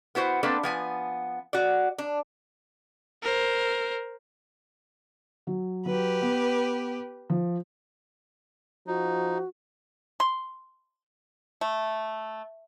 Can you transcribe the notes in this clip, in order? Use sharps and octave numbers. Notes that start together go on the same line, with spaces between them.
B3 E4 F#4 C5
A#3 C4 D4 A4 B4
F3 B3 G#5
F#4 D5
D4
A#4 C5
F#3
F#3 G4 B4
B3
F3
F3 D#4 F#4
C6
A3